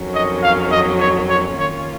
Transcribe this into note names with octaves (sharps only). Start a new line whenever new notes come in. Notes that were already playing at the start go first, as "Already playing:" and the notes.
Already playing: F2 D#3 F#3 C#4
D#5
F5
D#5
C#5
C#5
D#3 A#3 C#4 F4 C#5